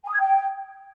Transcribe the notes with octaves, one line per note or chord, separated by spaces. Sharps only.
G#5
D#6
G#6
G5